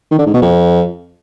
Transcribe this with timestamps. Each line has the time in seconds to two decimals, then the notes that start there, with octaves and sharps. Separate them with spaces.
0.11 D#3
0.19 D3
0.26 G#2
0.34 B2
0.42 F2